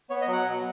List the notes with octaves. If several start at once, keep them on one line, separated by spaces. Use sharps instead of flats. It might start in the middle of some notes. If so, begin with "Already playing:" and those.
B3 C#5
D#5
F#3
F#5
B2